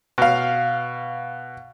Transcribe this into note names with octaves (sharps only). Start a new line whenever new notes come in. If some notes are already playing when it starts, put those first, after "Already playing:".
B2 F5